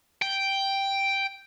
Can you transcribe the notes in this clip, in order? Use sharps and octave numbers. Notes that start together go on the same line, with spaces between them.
G5